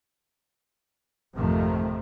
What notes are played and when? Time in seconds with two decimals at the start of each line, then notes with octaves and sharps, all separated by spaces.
1.35 G#1 F2 C3 D#3 F3 A3